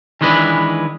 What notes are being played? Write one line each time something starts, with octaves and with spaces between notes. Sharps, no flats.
D#3 E3 G#3 D4 B4